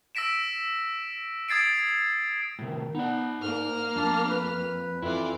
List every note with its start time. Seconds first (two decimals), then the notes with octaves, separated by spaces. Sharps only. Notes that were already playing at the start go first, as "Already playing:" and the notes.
0.15 E6 A#6 B6 D7 E7
1.49 D#6 G#6 A6 C7 D7
2.59 A2 C3 D#3
2.95 B3 D#4 D5
3.41 G#2 A#3 F6
3.96 F2 D4
4.30 B4
5.02 F2 E4 F4 B4 D5